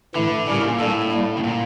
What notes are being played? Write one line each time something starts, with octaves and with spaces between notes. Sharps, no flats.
A2 D3 E3 A3 E4
A2 C#3 G3 C#4 G4 A#4
A#2
A2 G3 A#3 D4 A4
G3 A#3 E4
C#3
A#2